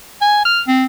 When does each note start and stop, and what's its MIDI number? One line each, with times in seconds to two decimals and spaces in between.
0.21 0.44 80
0.45 0.61 89
0.67 0.86 60